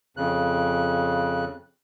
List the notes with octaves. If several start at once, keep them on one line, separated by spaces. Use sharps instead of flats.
F2 C#3 F#6